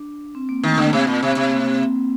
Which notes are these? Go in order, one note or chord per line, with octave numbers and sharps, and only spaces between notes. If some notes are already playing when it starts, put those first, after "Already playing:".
Already playing: D4
C4
A#3
D#3 A3
D3 A#3
C3 C4
A#2
C3
C3
A#3
C4